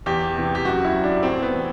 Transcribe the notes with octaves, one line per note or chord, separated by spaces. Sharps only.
E2 G4
C3 E3
G4
F#2 F#4
E4
F#3
D4
A2 C4
B3
E3